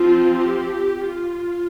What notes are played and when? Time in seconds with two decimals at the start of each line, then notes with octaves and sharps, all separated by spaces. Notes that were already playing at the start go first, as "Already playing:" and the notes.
Already playing: F3 C4 F4
0.36 G4
1.07 F4